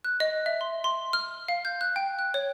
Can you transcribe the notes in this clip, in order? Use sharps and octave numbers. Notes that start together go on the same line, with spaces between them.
F#6
D#5
E5
C6
C6
F6
F5
G6
F#6
G5
F#6
C#5